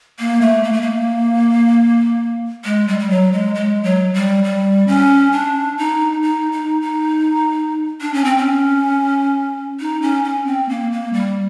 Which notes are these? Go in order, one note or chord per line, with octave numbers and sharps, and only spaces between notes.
A#3
A3
A#3
A3
A#3
G#3
G3
G3
F#3
G#3
G#3
F#3
G3
G3
C#4
D4
D#4
D#4
D#4
D#4
D4
C#4
C4
C#4
D#4
C#4
C#4
C4
A#3
A#3
G3